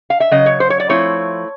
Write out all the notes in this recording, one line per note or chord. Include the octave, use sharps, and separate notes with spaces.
F5
E5
C#3 F#3 D#5
C#5
C5
C#5
D5
F3 A3 C4 E4 C#5